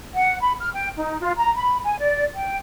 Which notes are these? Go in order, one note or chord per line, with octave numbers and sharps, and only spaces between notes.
F#5
B5
F6
G5
D#4
F4
A#5
B5
G#5
D5
G5